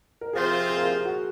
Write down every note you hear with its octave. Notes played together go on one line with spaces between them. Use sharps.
A#4
C3 F3 C4 F4 G#4 C5
G#4
A#4
G#4
F#4